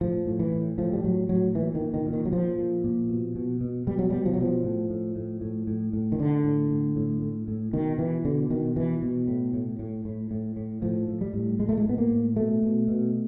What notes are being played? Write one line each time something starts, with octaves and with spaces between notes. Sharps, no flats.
A2 F3
A2
E3
A2
A2 F3
G3
A2 F#3
A2 F#3
A#2 E3
D#3
A#2
D#3
A#2
D#3
F#3
A#2 F3
A#2
A#2
B2
B2
B2
B2 G3
F#3
B2 G3
F3
F#3
B2 F3
A2
A2
A2
A2
A2
A2
D#3
A2 D3
A2
A2
A2
A2
A2
B2 D#3
B2 E3
B2 D3
B2 D#3
B2 E3
B2
A2
A2
A2
A2
A2
A2
A2 F3
A2
G3
A2
A2 G#3
A3
G#3
A2 B3
A#3
A2
B2 A3
B2
B2